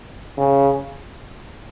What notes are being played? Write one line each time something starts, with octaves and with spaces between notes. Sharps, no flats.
C#3